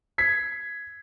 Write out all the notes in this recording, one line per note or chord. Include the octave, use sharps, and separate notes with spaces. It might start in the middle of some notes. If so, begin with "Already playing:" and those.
G#6 B6 C7